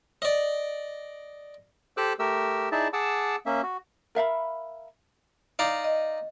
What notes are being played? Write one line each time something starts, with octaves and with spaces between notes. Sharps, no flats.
D5 D#5
G4 A4 C5 D6 E6 F#6
A3 G4 A#4 E6
D#4 E4 G#4 D5 E5 A5
G#4 F#5 A5 D6 E6
A#3 C#4 E5
F#4
A#4 E5 F5 B5
D#4 D5 F5
D#5